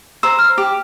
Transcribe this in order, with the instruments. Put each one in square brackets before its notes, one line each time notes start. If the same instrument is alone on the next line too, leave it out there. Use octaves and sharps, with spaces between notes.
[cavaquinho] C5 A#5 [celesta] E6
[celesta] F6
[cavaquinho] G4